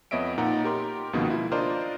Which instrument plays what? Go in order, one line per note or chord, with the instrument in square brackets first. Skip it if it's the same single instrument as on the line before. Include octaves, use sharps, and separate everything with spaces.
[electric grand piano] F2 B3 C#5 D#5 E5 D7
A#2 D#4 F#5 A#5
G4 A#4 C6
C#2 B2 D#3 F3 A#3 B3
E4 F4
D4 F4 A#4 C5 D5 D#5